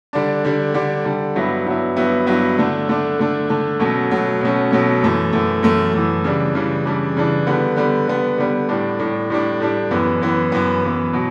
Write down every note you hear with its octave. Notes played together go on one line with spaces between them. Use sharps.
D3 G3 D4
D3 G3 D4
D3 G3 D4
D3 G3 D4
G2 F#3 B3 E4
G2 F#3 B3 E4
G2 F#3 B3 E4
G2 F#3 B3 E4
D3 A3 D4
D3 A3 D4
D3 A3 D4
D3 A3 D4
B2 F#3 A3 C#4
B2 F#3 A3 C#4
B2 F#3 A3 C#4
B2 F#3 A3 C#4
F#2 E3 A3
F#2 E3 A3
F#2 E3 A3
F#2 E3 A3
C#3 E3 G3 D4
C#3 E3 G3 D4
C#3 E3 G3 D4
C#3 E3 G3 D4
D3 G3 B3
D3 G3 B3
D3 G3 B3
D3 G3 B3
A2 G3 D4
A2 G3 D4
A2 G3 D4
A2 G3 D4
F#2 E3 B3
F#2 E3 B3
F#2 E3 B3
F#2 E3 B3
B2 F#3